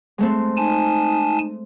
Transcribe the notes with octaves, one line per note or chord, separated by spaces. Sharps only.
G#3 A3 C4
D#4 G#5 A5